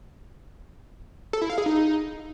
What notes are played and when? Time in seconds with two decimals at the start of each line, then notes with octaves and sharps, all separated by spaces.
1.33 A4
1.41 E4
1.50 F5
1.58 G#4
1.66 D#4